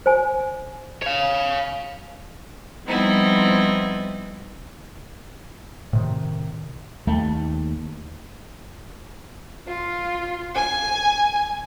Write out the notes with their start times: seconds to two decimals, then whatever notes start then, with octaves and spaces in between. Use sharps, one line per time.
0.06 C5 G#5
1.03 C#5 F5
2.87 F3 G3 B3 C4 D#4 E4
5.93 A2 C3 D#3
7.07 D#2 A3
9.68 F4
10.55 G#5